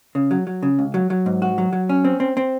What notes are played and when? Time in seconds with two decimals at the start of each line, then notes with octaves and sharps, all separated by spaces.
0.15 C#3
0.31 F#3
0.47 F#3
0.63 C#3
0.79 C#2
0.94 F#3
1.10 F#3
1.26 G#2
1.42 F#4
1.58 F#3
1.73 F#3
1.89 C#4
2.05 C4
2.20 C4
2.37 C4